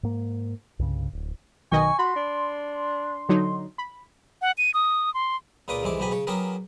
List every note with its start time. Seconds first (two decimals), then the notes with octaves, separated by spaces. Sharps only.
0.03 G#2 A#3
0.79 C2 G2 C#3
1.13 D1
1.72 B1 D#3 D#5 G#5 C#6
1.99 F#4 B5 C6
2.16 D4
3.29 D3 F#3 D#4
3.78 B5
4.42 F#5
4.58 D#7
4.74 D#6
5.14 C6
5.68 C#2 A#2 F4 B4 D6 D#6
5.83 C2 F2 E3 G#3 E4 D6
6.00 B1 G#2 B3 G4 G#5 B5
6.11 C#3 C#5
6.27 F#3 B3 C#4 G4 G#4 A#4